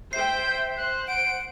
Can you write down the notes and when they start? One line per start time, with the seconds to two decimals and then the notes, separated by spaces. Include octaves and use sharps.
0.13 C5 E5 G5 G6 C7
0.77 C5 F#6
1.08 F#5 D7